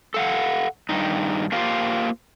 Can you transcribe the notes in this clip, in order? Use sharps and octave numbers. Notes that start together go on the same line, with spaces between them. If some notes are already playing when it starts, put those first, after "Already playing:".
A4 F5 F#5
G2 D#3 D#4
A#3 F4 G4 C5 F5